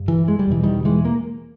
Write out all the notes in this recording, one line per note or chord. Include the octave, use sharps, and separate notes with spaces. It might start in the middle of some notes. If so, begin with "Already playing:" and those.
Already playing: G2
E3
G#3
G3
E2 B2 E3
D#3 G3
E3 G#3
A#3